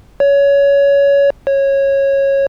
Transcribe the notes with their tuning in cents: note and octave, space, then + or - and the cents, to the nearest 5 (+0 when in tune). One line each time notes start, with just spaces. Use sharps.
C#5 +20
C#5 -15